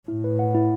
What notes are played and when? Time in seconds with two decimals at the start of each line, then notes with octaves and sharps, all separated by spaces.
0.08 A2 E4
0.24 B4
0.39 F#5
0.55 E4